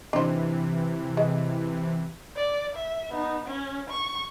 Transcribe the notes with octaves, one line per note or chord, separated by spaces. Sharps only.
C3 E3 D4 D#4 C5
G#3
D5
E5
B3 D#4
C#4
C#6